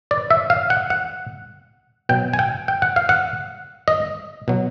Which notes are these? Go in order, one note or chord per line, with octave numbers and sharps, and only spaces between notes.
D5
E5
F5
F#5
F#5
B2 F#3 G5
G#5
G5
G5
F#5
F5
F#5
D#5
B2 F#3